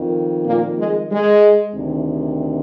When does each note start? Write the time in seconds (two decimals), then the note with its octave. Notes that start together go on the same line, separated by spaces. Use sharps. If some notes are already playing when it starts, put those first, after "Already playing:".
Already playing: F2 D#3
0.45 A#2 A#3
0.77 G#3
1.10 G#3
1.74 D2 C3 D#3